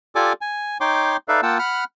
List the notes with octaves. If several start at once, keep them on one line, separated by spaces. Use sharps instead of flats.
F4 G4 A4 D5 G#5 D6
G#5
D#4 C#5 G5 C6 D6
D#4 A4 B4 D5 E5 F5
A#3 F4 F#5 G5 A5 E6
F#5 B5 F6 F#6